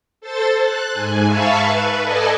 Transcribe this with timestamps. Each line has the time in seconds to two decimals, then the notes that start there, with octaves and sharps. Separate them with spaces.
0.21 A4 C5 A6
0.61 F#6
0.93 G#2 G#5
1.27 E5 F5 A5 B5 C#6
1.58 B4
2.02 A4 D5 D#5 G#5 A5